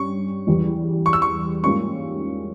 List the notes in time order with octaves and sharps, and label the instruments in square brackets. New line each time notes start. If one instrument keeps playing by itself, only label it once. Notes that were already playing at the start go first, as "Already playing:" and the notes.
Already playing: [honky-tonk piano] G2 G3 C#4 [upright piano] C#6
[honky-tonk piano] E2 E3 G3
[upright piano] C#6
E6
C#6
[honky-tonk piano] G#2 G3 A#3 C#4 F4 [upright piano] C#6